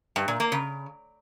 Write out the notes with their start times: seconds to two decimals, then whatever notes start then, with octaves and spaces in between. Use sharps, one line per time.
0.16 G2
0.28 A#2
0.40 A#3
0.52 C#3